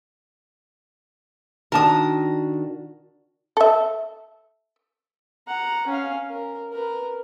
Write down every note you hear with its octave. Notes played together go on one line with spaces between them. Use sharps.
D#3 D4 F#4 A#4 A5 D#6
A4 E5
F#5 A#5
C#4 F5
A#4
A#4 B4